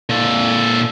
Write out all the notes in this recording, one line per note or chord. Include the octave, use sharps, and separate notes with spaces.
A#2 A4